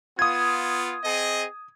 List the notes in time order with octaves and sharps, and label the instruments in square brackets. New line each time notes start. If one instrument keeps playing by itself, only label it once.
[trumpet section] B3 F4 [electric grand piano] D#6 G#6
[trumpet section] C4 G#4 D#5